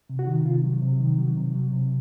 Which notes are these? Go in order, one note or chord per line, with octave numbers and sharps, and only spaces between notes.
C3
F#4
D#3
C3 F4
F#3
C3
D#3
F#3
C3
F#3
C3